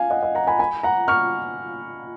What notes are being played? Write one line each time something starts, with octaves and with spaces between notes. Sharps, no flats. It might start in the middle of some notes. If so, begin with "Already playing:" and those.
Already playing: F5 G#5
D#5 F#5
D#5
F#5 A#5
G#5 B5
G#5 B5
F#5 A#5
C#6 F6